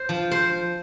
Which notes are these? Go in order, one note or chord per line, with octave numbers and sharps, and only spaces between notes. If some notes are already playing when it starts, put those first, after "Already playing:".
Already playing: C5
F3
C5